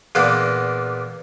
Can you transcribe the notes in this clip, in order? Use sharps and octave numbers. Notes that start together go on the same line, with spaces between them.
E2 A#2 A#3 D4